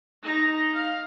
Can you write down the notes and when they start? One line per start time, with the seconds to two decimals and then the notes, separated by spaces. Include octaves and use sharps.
0.22 D#4 A#5
0.75 F5